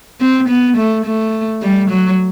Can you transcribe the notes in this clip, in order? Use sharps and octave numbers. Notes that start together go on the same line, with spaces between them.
C4
B3
A3
A3
G3
F#3